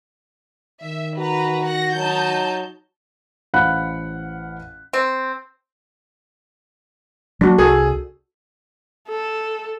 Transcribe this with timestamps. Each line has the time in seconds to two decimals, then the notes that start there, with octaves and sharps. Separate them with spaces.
0.83 D#3 E5
1.18 F#4 B4 A#5
1.67 F#5 A#6
1.96 F#3 D#4 A5 G6
3.54 A1 C5 F5 F#5 B5 F#6
4.93 C4
7.41 F#3 A#3 D4 F#4
7.58 C2 F#4 G#4 A4 D#6
9.08 A4